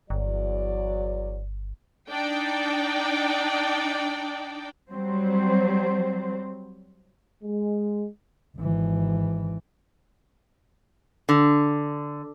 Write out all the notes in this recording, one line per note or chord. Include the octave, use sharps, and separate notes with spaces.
G1 E2 F#3 D5
D4 D#4 D5 G5
F#3 G3 C4 C5
G#3
G#1 E3
D3